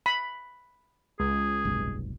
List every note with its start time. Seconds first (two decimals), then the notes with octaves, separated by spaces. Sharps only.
0.06 B5
1.20 C#2 G#4
1.65 F1 B1 G2